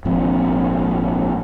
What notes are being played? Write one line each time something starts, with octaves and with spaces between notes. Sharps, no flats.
G#1 A#2 F3 C4